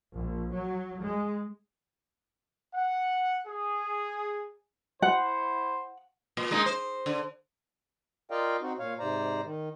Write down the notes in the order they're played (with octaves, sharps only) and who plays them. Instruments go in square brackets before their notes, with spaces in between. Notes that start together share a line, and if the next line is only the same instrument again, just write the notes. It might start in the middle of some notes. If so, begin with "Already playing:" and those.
[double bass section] A#1
F#3
G#3
[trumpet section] F#5
G#4
[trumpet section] E4 C5 [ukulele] F#5
[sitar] A#2
G#3 A#3 D#4
C5
D3
[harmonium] F4 A#4 D5 D#5 F5 G5
C4 D#4 F#4
A#2 C#5 F5
G#2 C3 C5 D5 A#5
D#3